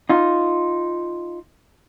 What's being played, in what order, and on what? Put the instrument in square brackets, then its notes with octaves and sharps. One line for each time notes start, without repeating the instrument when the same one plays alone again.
[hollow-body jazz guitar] D#4 F4